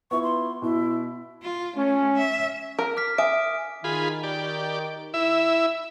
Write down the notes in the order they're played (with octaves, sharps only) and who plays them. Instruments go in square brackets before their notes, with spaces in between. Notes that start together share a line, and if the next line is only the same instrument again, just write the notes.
[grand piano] B3 E4 F4 [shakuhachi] C#6
[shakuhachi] C6
[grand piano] B2 [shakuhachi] E4
[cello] F4
[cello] A3 [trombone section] C#4
[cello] E5
[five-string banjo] A#4
[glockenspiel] D6 F6 B6
[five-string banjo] E5 [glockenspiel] G#5 D#6 D7
[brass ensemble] D#3 [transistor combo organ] F4 G#4 B5
[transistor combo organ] G4 D5
E4 E5